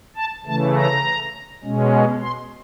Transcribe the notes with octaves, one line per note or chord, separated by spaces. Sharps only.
A5
C#3 E3 A3 A5
A#5
B2 G#3 C#4
C6